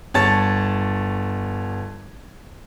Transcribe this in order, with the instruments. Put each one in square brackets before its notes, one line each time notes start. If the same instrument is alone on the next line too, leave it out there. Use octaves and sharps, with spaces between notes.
[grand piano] G1 C#5 A5 A6